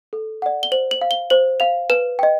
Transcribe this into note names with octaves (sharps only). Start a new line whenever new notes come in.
A4
D5 F#5
G7
C5 F#7
F#7
F5
G7
C5 F#7
F5 F7
B4 E7
D#5 G5